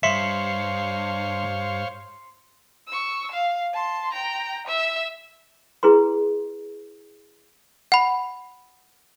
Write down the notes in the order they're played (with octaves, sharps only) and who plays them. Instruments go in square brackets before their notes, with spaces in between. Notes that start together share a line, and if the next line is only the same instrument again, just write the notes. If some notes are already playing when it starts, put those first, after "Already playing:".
[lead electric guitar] G2 [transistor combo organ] C5 C#5 F5 [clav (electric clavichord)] E5 [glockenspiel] C6 C7 C#7
[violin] C#6 E6
F5
A5 C6
G5 A#5
E5 E6
[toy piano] E4 G#4 B4 C6
[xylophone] F#5 B5